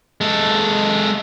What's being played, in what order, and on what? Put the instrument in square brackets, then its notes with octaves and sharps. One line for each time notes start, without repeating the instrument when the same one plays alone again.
[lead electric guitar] G#3 A4